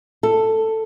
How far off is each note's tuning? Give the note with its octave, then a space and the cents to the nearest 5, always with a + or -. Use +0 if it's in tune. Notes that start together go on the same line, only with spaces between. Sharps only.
A4 +10